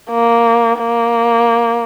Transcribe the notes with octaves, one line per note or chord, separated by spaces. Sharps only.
A#3
A#3